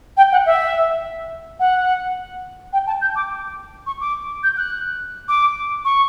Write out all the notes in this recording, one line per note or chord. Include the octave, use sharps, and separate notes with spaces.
G5
F#5
E5
F#5
G5
A5
G6
D6
C#6
D6
G6
F#6
D6
C#6